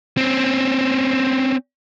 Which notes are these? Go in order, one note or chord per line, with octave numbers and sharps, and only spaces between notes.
C4 C#4